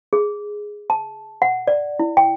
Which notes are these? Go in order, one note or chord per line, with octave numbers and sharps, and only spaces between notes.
G#4
A5
F#5
D5
E4
G5